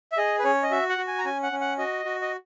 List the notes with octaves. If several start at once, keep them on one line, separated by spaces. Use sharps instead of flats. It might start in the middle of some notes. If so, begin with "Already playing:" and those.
E5
G#4 D#5
B4
C#4 C#5
D#5
F#4 E5
F#5
F#4
G#5
A#5
C#4 G#5
F#5
C#4
F#5
F#4 D#5
F#4
D#5